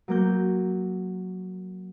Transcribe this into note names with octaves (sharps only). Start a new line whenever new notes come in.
F#3 A#3 G6